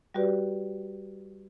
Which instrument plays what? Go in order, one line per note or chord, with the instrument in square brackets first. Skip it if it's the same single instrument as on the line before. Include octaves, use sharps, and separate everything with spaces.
[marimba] G3 F#4 G4 B4 D5